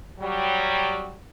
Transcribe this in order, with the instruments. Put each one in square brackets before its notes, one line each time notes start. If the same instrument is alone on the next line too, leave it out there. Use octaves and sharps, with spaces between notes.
[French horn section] F#3 G3